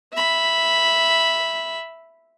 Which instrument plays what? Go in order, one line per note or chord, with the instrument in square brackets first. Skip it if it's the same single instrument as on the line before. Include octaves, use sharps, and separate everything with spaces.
[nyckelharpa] E5 B5